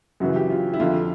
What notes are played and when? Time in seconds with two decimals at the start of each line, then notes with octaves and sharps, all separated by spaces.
0.20 F#2 C#3 E3 F#4
0.36 G4
0.50 F4
0.74 E4
0.80 F2 D3 F4